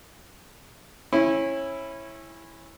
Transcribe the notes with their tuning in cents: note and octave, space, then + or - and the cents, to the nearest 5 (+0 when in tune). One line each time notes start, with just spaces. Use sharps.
C#4 -25 E4 +0